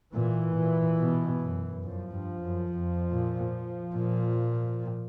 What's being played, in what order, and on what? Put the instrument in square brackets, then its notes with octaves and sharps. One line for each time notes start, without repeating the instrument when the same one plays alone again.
[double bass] A#2 [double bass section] E3
[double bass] A#2
B2
F#2
[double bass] F#2 [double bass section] F3
[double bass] G2
F#2
F2
A#2
A#2